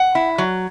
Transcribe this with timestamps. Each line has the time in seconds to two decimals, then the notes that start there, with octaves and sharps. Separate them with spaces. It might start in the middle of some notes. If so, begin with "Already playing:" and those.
Already playing: F#5
0.15 E4
0.38 F#3